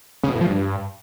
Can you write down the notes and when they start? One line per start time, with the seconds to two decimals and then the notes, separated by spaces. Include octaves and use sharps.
0.23 C#3
0.29 B2
0.35 A2
0.41 F3
0.47 G2